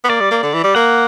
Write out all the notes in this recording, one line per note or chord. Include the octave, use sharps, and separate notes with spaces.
B3
A#3 D5
G3
A#3
D3
E3
G3
A#3 F#5